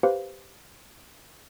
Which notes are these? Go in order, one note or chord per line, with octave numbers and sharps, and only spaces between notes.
G4 B4 C5 F5